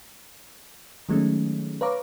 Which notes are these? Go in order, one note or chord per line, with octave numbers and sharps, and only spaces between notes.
D#3 F#3 G#3 A3 C#4
B4 C#5 F5 A#5 D6